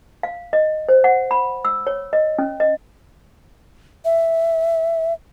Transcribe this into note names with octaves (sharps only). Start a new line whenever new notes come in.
F5
D#5
C5
F#5
B5
E6
C#5
D#5
C#4
D#5
E5